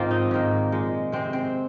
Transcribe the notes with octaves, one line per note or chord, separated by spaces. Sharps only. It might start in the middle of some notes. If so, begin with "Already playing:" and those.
Already playing: G#2 D#3 A#3 C4 F4 A#4 C5
D#4
G#2 D#3 A#3
A#2 G#3
C3 G#3 C4
C4